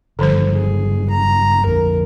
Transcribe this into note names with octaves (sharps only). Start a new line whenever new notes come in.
F#1 G2 D3 F3 C5
G#4
A#5
A#1 F2 A#4